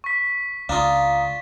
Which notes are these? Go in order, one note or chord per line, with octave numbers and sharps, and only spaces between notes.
C#6 B6
C#2 D4 F4 F5 A#5 D#6